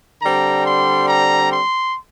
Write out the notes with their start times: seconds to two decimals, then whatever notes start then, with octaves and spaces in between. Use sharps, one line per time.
0.22 D3 G3 C4 A#5
0.65 C6
1.08 A#5
1.51 C6